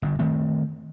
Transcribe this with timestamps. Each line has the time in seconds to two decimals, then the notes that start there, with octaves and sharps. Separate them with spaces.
0.02 G1 G2
0.19 D#3 A3 C4